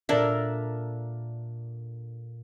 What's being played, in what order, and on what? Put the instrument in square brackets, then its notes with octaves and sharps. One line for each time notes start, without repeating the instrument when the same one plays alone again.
[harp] A#2 A4 G#6 [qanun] D4 A#4 E5